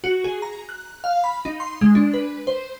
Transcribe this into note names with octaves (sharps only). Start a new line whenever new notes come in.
F#4
G#4
A#5
F#6
F5
B5
D#4
C6
G#3
D4
B4
C5